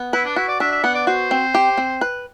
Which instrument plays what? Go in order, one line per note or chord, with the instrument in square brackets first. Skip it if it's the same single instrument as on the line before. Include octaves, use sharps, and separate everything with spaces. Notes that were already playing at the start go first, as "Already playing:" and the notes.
Already playing: [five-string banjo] B3
[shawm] E4 [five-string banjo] B4
[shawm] D4
[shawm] E4 [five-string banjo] F#4
[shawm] D5
[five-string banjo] D4 [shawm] E5
[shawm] E5
[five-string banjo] B3 [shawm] F#5
[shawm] D5
[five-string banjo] F#4 [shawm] C5
[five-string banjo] C4
G4
C4
B4